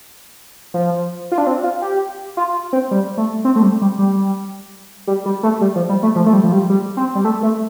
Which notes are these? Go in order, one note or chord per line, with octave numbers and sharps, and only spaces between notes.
F3
F4
D4
C4
F4
G4
F4
C4
G3
A3
C4
A3
G3
G3
G3
G3
G3
A3
G3
F3
G3
A3
F3
A3
G3
F3
G3
G3
C4
G3
A3
A3